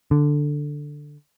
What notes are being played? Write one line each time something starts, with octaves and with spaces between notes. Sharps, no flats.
D3